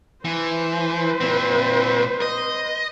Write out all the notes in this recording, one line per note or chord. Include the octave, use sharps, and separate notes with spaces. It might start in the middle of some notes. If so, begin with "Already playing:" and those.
E3 B4 C5
A#2 C4
D#5